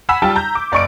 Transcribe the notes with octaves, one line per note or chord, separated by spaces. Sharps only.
F#5 G#5 B5 E6 B6 E7
G3 F4 G5 A5
A#5 G6
D6
F#1 D5 D#5 C#6 D6 D7